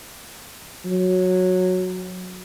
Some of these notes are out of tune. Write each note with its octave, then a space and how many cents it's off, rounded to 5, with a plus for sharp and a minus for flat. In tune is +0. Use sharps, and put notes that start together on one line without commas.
F#3 -10